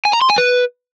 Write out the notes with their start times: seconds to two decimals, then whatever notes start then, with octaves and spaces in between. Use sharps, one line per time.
0.05 G#5
0.13 A#5
0.22 C6
0.30 G#5
0.38 B4